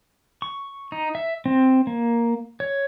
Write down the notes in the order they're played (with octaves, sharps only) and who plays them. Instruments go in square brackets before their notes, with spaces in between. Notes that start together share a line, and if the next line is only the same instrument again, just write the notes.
[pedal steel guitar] C#6
D#4
E5
C4
A#3
C#5